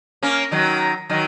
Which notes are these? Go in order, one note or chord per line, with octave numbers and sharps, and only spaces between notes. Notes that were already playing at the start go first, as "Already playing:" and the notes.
A#3 C#4
D#3 F#3
D#3 F#3